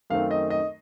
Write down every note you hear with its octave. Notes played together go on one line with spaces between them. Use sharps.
F#2 D#3 A3 C4 F5
D#5
D#5